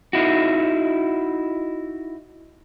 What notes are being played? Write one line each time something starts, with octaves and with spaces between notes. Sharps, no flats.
D#4 E4 F#4